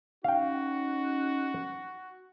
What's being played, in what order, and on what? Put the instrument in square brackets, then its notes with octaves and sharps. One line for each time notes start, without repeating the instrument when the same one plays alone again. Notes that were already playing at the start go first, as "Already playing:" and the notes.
[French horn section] C#4 D#4 [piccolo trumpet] F#4 [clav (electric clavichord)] F5 G5